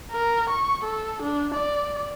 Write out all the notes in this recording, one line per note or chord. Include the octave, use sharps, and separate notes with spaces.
A#4
C#6
A4
D4
D5